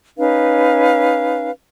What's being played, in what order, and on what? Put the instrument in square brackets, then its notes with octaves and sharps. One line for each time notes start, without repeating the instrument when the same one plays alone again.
[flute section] C#4 D#4 B4 F5